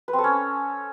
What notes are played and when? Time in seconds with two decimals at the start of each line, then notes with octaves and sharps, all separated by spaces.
0.08 B4
0.13 C4
0.19 A4
0.24 C#4